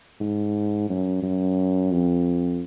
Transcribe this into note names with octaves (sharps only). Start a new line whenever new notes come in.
G#2
F#2
F#2
F2